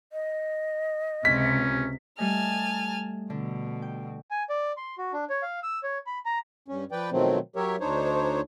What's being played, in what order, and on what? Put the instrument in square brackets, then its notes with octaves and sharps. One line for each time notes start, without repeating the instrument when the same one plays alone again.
[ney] D#5
[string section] C#2 C3 [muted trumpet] C#4 [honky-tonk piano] B6
[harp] G3 A3 D#5 [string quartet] G#5 A5 F6
[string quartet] B2 [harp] D3
[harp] G5
[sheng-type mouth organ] G#5
D5
C6
F#4
D4
C#5
F5
E6
C#5
B5
A#5
[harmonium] G2 C#4
F3 B4 D5 G5
B2 D#3 F3 F#3 A3 C4
F#3 G4 A#4 C#5 E5
D2 D4 D#4 C5 C#5